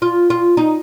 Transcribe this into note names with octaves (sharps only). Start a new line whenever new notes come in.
F4
F4
D#4